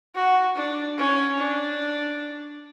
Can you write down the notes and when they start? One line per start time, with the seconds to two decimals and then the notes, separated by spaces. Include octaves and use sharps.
0.15 F#4
0.56 D4
0.98 C#4
1.39 D4